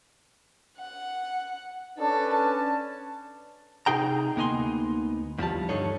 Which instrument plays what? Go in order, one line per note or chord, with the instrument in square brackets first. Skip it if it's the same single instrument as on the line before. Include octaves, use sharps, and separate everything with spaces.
[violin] F#5
[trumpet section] C#4 D4 B4 [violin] A4
[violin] A5
[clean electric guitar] C3 D#4 G#4 G5 A#5
D2 A#3 B3 D#4 G#5 C6
E2 F3 G3 A5
D2 G2 D4 D#4 A4 C#5